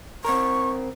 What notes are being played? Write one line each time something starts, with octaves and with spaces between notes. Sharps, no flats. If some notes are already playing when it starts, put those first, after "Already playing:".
C4 A#4 C#6